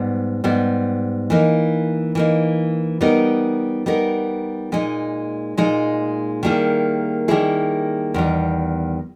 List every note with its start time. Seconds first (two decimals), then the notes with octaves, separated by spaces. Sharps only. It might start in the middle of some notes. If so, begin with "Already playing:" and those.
Already playing: G#2 G3 B3
0.44 G#2 G3 B3
1.30 E3 A#3 D#4
2.15 E3 A#3 D#4
3.01 G3 B3 D#4 A#4
3.86 G3 B3 D#4 A#4
4.72 A#2 G#3 D#4
5.57 A#2 G#3 D#4
6.43 D#3 G3 A#3 E4 G#4
7.28 D#3 G3 A#3 E4 G#4
8.14 E2 D#3 G3